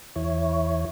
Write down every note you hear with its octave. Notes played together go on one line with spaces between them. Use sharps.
E2 E4 C#5